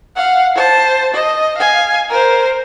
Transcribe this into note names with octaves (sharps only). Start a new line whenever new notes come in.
F5 F#5
C5 A5
D#5
F5 G#5
A#4 C5